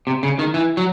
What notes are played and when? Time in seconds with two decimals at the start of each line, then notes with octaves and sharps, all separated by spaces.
0.07 C3
0.23 C#3
0.39 D#3
0.54 E3
0.77 F#3